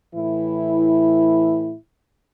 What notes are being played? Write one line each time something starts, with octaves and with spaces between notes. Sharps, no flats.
A2 E3 E4